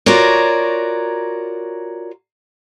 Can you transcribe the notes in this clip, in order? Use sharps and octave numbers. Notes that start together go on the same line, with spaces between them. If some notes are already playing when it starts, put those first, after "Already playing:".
F4 F#4 A#4 C#5 D5